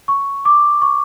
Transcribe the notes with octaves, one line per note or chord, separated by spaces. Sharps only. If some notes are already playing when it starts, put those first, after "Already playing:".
C#6
D6
C#6